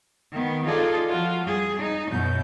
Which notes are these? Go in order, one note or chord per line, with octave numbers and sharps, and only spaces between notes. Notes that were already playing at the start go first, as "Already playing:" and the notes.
D#3 B3
D#4 F4 G#4 A4 D5
F3 F4 F#4
G3 G#4
D#4
F#2 B2 G6